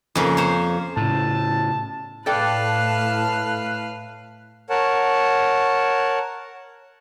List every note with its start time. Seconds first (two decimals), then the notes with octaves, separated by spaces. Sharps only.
0.15 F2 C#3 A#3
0.37 C5 C#5
0.97 A2 C#3 A5
2.26 A2 A4 B4 D5 F5 G5 A5 F#6
4.70 A#4 C#5 F#5 A5